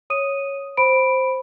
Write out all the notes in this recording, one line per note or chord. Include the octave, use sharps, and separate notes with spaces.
C#5 D#6 D#7
C5 B5 D7